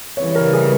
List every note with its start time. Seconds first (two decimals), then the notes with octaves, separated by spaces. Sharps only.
0.17 C#3 E3 G3 C#5
0.35 A#4
0.53 G#4